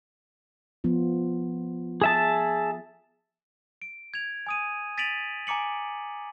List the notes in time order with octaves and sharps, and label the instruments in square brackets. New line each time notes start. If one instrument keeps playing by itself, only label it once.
[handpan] F3 B3 F4
[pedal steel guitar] G#4 E5 A5
[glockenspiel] D7
G#6 F7
G#5 D#6 D#7
A6 B6 D7 D#7 F7 F#7
G#5 A#5 D6 C#7 F#7